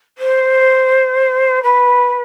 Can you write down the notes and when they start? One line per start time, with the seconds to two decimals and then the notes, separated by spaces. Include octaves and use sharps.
0.18 C5
1.63 B4